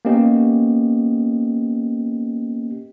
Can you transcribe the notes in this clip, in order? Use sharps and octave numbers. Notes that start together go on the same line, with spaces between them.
A#3 B3 C#4 G4 D#5